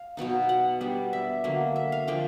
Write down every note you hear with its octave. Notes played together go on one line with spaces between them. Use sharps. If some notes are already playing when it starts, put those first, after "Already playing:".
Already playing: F5
B2 F#3 B3 D#4
F#5
G3 B3 D4
E5
D3 F#3 A#3
E5
F5
D3 F3 A#3 D4 G5